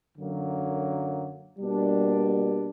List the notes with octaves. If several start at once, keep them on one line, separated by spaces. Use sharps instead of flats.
F#2 D3 F#3 A#3
B2 G3 A#3 D4